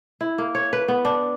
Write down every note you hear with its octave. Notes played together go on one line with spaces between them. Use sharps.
E4
A#3
C#5
B4
B3
D4